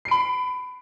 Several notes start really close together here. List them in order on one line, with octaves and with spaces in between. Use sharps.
C7 D7 B5